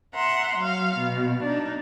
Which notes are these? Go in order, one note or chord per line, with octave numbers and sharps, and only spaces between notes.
E5 F#5 A#5 C6
F#3 F5
B2
D4 D#4